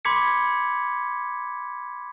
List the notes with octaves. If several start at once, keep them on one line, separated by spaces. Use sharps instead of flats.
B5 C6 D6 G#6 B6 C#7